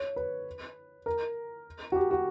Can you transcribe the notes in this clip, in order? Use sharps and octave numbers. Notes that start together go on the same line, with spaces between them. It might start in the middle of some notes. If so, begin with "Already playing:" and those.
Already playing: C#5
B4
A#4
F#4
G4
F#4